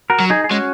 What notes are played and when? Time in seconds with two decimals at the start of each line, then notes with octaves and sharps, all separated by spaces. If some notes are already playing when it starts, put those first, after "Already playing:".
0.10 F#4 A#4
0.20 F#3
0.30 D#4 G#4
0.44 G#4
0.50 G#3 C#4 F#4